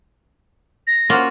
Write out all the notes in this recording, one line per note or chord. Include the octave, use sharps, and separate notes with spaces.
A#6
A#3 C#4 F4 F#4